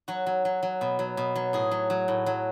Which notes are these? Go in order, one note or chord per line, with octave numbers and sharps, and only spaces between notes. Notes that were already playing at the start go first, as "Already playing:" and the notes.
F#3 F#4
F#3
F#3
F#3
B2
F#3
B2
F#3
A2 G#4
F#3
F#3
A2
F#3